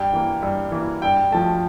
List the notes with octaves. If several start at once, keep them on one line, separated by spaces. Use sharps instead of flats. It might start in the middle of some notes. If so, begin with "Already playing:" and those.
Already playing: G2 G5
E3 A#3
G2
E3 A#3
G2 G5
F3 A3 A5